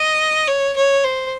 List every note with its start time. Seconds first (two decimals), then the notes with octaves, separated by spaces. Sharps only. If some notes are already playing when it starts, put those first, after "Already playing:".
Already playing: D#5
0.48 C#5
0.76 C#5
1.04 C5